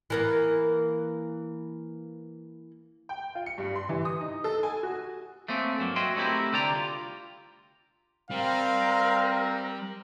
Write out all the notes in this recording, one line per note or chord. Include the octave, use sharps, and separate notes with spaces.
E3 A#3 B3
G5
F4
C#7
G2
C6
E3
D#6
D#4
A4
G#5
F#4
A3 A#3 C4 C#4
G2 F#3 A#3
F#4 C#5 D#5 E5 G5 C6
A3 C4 D#4 E4 G4 A#4
C2 D3 G4 D5 A#5
F4
G3 C4 A#4 F5